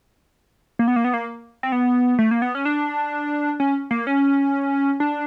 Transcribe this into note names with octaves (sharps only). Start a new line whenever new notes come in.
A#3
B3
A#3
B3
A#3
C4
B3
A3
A#3
B3
C#4
D4
C#4
A#3
C#4
D4